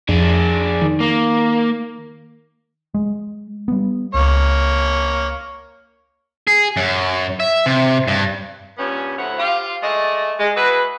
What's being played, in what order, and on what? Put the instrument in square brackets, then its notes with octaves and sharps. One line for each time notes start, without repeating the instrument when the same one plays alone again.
[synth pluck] F2 [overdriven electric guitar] D4 G#4
[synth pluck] D#3
[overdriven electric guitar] A#3
[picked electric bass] G#3
G3 B3
[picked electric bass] C#2 [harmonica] A#3 C#5
[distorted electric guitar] G#4
F#2
E5
C3
G2
[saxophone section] G2 A#2 B3 C#4
D2 F#3 E4 C5 C#5 F#5
F4 G4 C5 F5
G#3 A3 D5 D#5
G#3
E4 F#4 G#4 B4